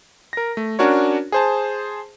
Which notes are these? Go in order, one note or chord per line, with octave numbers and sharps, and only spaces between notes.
A#4 A#6
A3
C#4 D4 F#4 A#4 C#5
G#4 C5 A5